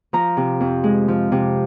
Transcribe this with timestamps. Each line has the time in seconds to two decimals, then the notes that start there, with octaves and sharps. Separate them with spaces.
0.13 F3 A#5
0.37 C3
0.60 F2
0.84 G#3
1.08 F3
1.32 C3